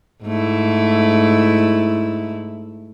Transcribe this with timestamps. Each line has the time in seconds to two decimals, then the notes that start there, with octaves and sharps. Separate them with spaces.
0.24 G#2 A3 E4